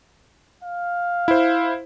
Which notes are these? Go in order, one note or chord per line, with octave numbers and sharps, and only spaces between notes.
F5
E4 C5